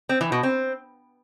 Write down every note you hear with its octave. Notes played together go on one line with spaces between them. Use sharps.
C4
E3
B2
C4